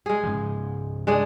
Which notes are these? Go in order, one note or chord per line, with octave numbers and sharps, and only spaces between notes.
G#3 G#4
G#2 C#3 F3
G#3 D4 G#4